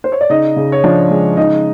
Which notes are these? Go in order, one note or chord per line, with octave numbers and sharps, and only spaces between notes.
C5
C#5
D5
C#3 D#4 D#5
C#3
C#5
F3 D4 D5
G#3
C#3 D#4 D#5